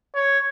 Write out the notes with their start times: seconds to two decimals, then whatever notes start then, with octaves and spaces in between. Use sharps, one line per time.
0.15 C#5